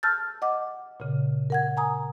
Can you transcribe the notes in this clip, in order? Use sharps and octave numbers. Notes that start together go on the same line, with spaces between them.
A5 E6 F6 G6 A6
D#5 F#5 D6
A#2 C#3
A#4 F#5 G#6
G#5 A#5 D#6